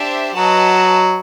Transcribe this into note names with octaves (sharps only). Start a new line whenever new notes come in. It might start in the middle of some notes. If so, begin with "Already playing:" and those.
Already playing: D4 G4 C5 E5
F#3 F#4 B4 D#5 F#5 A5